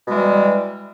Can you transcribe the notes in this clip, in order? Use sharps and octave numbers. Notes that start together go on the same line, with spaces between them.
B2 E3 G3 G#3